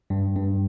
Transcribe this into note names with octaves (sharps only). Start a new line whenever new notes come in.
G2
G2